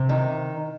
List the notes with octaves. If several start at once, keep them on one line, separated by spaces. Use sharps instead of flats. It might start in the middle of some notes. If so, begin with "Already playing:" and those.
Already playing: C3
D#3